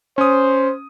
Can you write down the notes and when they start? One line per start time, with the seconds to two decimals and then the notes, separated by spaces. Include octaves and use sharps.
0.18 C#4 C5 D#6